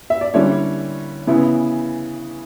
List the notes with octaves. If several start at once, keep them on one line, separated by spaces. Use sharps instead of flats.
E5
D5
D3 G3 A#3 C#4 E4 C#5
C#3 E3 B3 E4